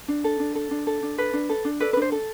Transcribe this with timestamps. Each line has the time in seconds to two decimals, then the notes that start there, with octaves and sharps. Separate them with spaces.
0.08 D4
0.24 A4
0.40 D4
0.55 A4
0.71 D4
0.87 A4
1.03 D4
1.18 A4 B4
1.33 D4
1.49 A4
1.65 D4
1.80 A4 B4 D5
1.93 B4
1.97 D4 C5
2.12 A4